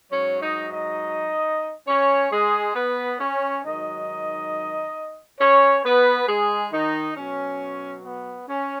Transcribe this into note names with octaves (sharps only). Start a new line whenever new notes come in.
G#2 F#3 C#4 C#5
D#4 D#5
D#4 D#5
C#4 C#5
G#3 G#4
B3 B4
C#4 C#5
G#2 D#3 F#3 D#4 D#5
C#4 C#5
B3 B4
G#3 G#4
D#3 D#4
B2 F#3 C#4
B3
C#4